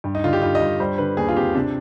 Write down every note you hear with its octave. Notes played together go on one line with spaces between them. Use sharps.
G2
D#4
D3 F4
G4
G2 F4
D#5
G2
G3 C5
D3 B4
D#2 G#4
F4
C4 G4
C3 D4